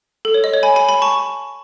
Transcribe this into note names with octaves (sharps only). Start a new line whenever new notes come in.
A4
C#5
D#5
C#5
G#5 B5
G#5 B5
G#5 B5
A5 C#6